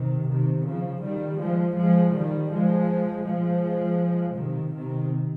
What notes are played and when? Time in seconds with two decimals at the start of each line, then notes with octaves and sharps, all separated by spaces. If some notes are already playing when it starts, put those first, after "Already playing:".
Already playing: C3 D#3
0.30 C3 D#3
0.67 C#3 F3
1.04 D#3 G3
1.41 F3 G#3
1.78 F3 G#3
2.16 D#3 G3
2.52 F3 G#3
3.26 F3 G#3
4.37 C3 D#3
4.74 C3 D#3